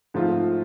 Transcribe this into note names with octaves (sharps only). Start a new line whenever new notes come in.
G#2 F3 A3 C4 F4